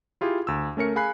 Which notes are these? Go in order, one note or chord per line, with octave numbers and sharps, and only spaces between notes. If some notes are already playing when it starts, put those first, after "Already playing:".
E4 F4 G4 G#4
D2 E6
A3 C#4 A#4 C#7
G#4 F5 G#5 B5 F#6 C7